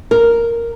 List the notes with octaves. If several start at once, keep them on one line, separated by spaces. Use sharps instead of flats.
A#4